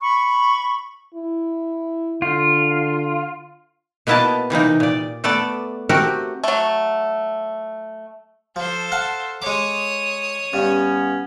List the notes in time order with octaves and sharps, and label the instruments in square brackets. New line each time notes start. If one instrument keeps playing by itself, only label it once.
[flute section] B5 C#6
[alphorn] E4
[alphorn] D3 [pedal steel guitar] F4
[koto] B2 A#3 B3 E4 D#5 A5
C3 E3 A#3 D#4
A#2 D5
A3 B3 A4 D5
A3 C4 F#4 G4 A#4
[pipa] F#3 A3
[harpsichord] F3 [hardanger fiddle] A4 C5
[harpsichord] F5 F#5 A5
[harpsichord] G#3 D6 [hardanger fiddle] C#5 D#6
[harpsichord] G2 [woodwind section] B3 C#4